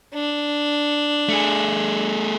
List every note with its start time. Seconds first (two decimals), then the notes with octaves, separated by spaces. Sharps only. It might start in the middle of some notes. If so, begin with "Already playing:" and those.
0.15 D4
1.29 A3 G#4